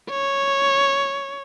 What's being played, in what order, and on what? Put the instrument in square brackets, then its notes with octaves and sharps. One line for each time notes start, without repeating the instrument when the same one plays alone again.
[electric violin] C#5